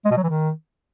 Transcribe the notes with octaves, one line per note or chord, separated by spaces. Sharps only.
G#3
B2
F#3
E3
D#3